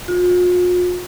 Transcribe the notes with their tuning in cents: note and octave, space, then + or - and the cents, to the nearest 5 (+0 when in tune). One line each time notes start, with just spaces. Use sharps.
F4 +45